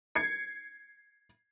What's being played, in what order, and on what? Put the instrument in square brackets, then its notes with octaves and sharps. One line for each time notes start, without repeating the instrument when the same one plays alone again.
[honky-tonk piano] G#6 C7 C#7